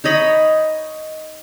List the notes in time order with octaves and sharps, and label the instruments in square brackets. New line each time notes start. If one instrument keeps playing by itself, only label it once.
[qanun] D#4 C#5 D#5 B5